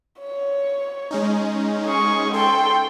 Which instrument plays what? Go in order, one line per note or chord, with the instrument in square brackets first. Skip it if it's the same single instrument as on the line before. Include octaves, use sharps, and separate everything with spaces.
[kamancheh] C#5
[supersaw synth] G#3 C#4 D#4
[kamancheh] G#4 C#6
[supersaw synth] A4 [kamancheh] G5 C6